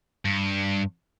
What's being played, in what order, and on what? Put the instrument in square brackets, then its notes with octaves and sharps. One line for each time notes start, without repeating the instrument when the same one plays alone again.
[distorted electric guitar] G2